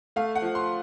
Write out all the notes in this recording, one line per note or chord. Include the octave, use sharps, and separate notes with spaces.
A3 F5
F#5
F3
C6